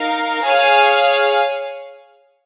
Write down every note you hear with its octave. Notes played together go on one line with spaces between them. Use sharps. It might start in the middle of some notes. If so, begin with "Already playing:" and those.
Already playing: D#4 A#4 F5
G#4 C#5 F5 G#5